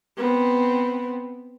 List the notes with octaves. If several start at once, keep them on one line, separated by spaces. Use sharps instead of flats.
B3 C4